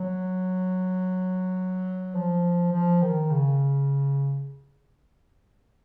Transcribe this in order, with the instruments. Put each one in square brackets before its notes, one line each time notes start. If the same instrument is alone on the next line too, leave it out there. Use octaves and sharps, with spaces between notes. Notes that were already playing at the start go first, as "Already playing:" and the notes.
Already playing: [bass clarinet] F#3
F3
F3
D#3
C#3